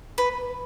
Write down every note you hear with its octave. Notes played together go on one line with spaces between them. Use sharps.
B4